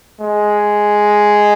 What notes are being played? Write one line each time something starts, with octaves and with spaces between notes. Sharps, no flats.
G#3